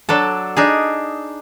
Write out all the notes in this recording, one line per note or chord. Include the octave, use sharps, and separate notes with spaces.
F#3 D4 A4
D4 D#4 G#4